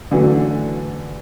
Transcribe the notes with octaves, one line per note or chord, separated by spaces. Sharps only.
D3 E3 F#3 A3